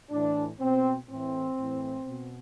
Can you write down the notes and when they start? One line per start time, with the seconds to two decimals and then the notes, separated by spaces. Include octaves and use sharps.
0.10 A2 E3 D4
0.60 B2 C4
1.08 A2 E3 C4
1.58 A2 E3
2.07 B2